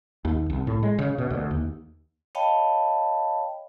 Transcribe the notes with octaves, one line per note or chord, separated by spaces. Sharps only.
D#2
C2
A2
G#3
C#3
B2
D2
D#2
C#5 D#5 F5 G5 A5 B5